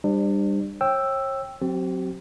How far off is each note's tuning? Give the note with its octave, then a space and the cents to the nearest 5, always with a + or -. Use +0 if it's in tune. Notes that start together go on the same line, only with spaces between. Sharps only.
G3 +20 D4 +35 C5 -10
C#5 -40 G5 +0 E6 +5
F#3 -25 C4 +0 G4 -45